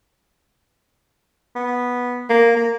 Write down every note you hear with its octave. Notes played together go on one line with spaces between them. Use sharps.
B3
A#3
A#3